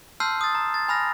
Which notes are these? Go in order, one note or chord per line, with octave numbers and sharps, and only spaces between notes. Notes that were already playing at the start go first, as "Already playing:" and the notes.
A5 C6 E6 F6 G6 C7
D#6 A6
A#5
A6
G#5 B5 F6 A#6